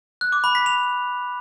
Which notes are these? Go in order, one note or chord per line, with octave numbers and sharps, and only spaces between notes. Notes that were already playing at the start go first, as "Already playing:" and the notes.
F#6
D6
B5
B6
F7